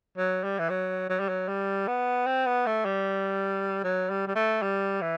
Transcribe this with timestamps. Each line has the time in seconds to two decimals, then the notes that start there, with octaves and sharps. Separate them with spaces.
0.17 F#3
0.44 G3
0.59 E3
0.70 F#3
1.09 F#3
1.20 G3
1.29 F#3
1.48 G3
1.88 B3
2.27 C4
2.46 B3
2.66 A3
2.85 G3
3.84 F#3
4.10 G3
4.27 G3
4.36 A3
4.62 G3
5.01 E3